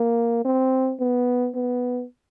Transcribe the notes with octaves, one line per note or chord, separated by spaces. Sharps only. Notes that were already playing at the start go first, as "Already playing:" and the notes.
Already playing: A#3
C4
B3
B3